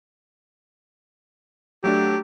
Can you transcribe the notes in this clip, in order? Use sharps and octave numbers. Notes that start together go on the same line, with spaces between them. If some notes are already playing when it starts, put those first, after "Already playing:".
F#3 A3 D4 G4